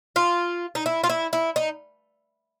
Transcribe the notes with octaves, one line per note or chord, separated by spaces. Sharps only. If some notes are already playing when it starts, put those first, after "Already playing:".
F4
D#4
E4
F4
E4
E4
D#4